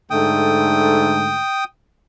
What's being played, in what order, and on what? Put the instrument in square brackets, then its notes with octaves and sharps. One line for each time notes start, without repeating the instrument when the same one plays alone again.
[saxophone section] G#2 D3 A3 [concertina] G5 D#6